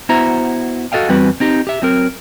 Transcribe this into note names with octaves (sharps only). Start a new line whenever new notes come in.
B3 E4 F#4 C5 E5 A#5
F#4 A4 D#5 F5 G5
E2 G3 C4 F#4 B4
C4 D#4 G4
G4 E5
F#3 C4 A#4